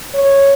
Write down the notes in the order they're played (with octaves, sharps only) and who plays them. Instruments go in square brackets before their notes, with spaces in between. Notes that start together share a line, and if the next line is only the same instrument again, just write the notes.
[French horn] C#5